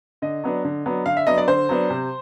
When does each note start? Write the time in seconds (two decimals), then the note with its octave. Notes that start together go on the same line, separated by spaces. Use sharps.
0.22 D3 D#5
0.44 F#3 B3 D4
0.64 D3
0.86 F#3 B3 D4
1.06 D3 F5
1.17 E5
1.27 F#3 B3 D4 D#5
1.38 D5
1.48 D3 C5
1.69 F#3 B3 D4
1.90 C3